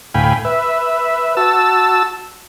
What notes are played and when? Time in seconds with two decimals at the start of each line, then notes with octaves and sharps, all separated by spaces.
0.14 D2 A2 F5 G5 G#5 B5
0.45 B4 E5
1.37 F#4 A5 E6